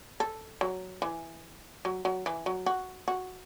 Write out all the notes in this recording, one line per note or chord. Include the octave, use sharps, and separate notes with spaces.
A4
F#3
E3
F#3
F#3
E3
F#3
F#4
F#4